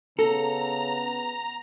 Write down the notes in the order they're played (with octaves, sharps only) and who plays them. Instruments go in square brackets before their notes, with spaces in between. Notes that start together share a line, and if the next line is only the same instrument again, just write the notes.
[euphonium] C#3 [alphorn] B3 [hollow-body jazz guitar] A4 [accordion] A#5